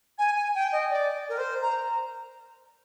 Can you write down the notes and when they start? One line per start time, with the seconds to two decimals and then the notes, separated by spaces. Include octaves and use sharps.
0.18 G#5
0.36 G#5
0.54 G5
0.72 D#5
0.90 D5
1.29 A#4
1.38 C5
1.62 A#5